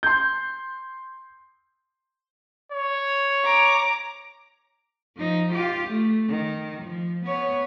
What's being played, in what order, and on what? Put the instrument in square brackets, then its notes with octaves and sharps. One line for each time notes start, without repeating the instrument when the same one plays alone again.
[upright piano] C6 G6
[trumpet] C#5
[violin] A#5 D6
[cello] F3 D#4
F4 G4
A3
D#3
F3
B3 C#5